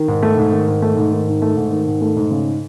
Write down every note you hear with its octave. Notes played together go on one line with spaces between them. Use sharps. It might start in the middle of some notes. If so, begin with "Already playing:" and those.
Already playing: D#3
G#2
A3
G#2
D#3
G#2
A3
G#2
D#3
G#2
A3
G#2
D#3
G#2
A3
G#2
C#3